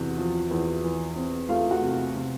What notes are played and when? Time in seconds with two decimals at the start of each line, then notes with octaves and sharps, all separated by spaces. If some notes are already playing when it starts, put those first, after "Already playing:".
Already playing: E2 C3 F#4
0.18 F3
0.51 E2
0.84 E3
1.16 C4
1.49 A3 F4 F5
1.71 F#4 F#5
1.82 C3
2.16 C3